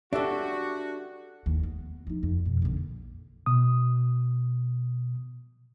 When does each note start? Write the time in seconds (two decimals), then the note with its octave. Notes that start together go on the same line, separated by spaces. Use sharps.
0.13 D4 F#4 G4 A4 D5 E5
1.46 F#1 D#2
1.63 B3
2.07 F3 D#4
2.23 F2
2.45 F2 B2
2.62 A#1 D3
3.46 B2 D#6